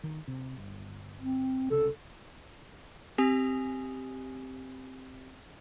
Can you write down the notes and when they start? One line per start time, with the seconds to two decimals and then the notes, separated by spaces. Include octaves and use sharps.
0.04 D#3
0.28 C3
0.57 G1
1.22 C4
1.71 C2 C#3 A4
3.18 C4 G4 G#5 D#6